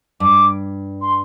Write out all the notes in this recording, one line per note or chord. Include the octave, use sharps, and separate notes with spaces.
G2 D6
C6